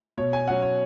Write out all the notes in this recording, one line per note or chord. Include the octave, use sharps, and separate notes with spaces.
B2 C#5
G#5
F#3 C#4 F#5
C#5